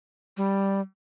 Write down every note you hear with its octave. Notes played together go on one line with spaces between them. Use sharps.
G3